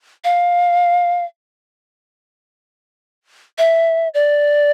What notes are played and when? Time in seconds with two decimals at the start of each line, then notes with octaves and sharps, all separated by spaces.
0.24 F5
3.58 E5
4.14 D5